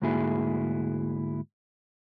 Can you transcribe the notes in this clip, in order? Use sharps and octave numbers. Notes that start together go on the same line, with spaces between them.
D2 G#2 A#3 E4 F#4 G#4